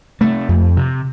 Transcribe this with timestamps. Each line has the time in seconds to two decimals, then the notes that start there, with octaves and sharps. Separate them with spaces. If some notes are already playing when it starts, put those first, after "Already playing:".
0.21 C3 A3
0.49 F2
0.77 C3